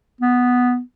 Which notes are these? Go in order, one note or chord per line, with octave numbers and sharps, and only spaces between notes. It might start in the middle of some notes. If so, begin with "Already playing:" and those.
B3